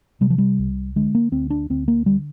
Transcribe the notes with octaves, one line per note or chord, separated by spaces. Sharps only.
C3 G3
F3
G3
C2
D3 G#3
A#3
D2 C4
D4
D2 C4
A#3
D3 G3